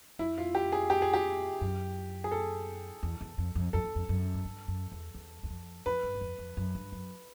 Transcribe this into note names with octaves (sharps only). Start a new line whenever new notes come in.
F2 E4
F4
G4
G#4
G4
G#4
G4
F#2
G#4
A4
E2
E2
F2
F2
F2 A4
E2
F2
F#2
G#2
G2
F#2
E2
E2
E2
F2
F2 B4
G2
F#2
F2
F2
F#2
G2
F#2